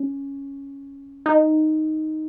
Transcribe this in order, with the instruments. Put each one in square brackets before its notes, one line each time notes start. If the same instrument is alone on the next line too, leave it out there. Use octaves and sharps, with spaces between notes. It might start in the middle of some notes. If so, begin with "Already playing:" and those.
Already playing: [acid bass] C#4
D#4